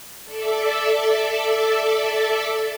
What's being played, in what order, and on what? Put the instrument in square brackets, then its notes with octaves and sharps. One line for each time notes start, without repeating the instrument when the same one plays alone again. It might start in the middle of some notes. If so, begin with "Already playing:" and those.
[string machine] A4 D5 E5